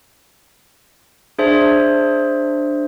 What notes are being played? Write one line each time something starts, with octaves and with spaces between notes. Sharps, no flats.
D4 G#4 C5 E5